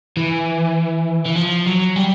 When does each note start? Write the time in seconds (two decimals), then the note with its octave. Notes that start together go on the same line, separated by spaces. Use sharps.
0.17 E3
1.26 E3
1.36 F3
1.67 F#3
1.96 G3